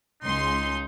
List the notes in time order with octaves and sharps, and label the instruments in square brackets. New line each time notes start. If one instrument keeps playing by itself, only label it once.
[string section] C#2 C6 [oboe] D#4